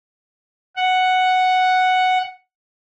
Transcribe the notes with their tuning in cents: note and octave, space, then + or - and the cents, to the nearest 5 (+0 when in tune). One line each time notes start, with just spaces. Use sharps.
F#5 +0